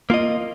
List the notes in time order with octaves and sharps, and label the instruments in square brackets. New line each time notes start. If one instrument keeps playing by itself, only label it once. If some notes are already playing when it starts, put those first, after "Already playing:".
[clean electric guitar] A#3 F4 D#5